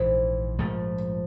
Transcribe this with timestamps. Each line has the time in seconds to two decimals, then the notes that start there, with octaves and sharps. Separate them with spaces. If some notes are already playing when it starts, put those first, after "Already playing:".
Already playing: A#1 G#2 E3 C5
0.58 A#1 G#2 F3 A3